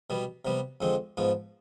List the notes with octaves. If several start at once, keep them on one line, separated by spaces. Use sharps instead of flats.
B2 G3 B3
C3 G3 B3
F2 D3 G#3 C4
G#2 F3 B3